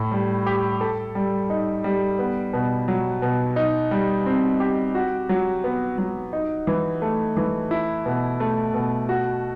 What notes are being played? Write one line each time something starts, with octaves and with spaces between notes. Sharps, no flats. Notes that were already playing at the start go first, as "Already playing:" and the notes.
Already playing: A2
G3
G4
A4
G3
D#4
G3
B3
B2
F#3
B2
D#4
G3
C4
G4
F#4
F#3
B3
F#3
D#4
E3
A3
E3
E4
B2
A3
B2
F#4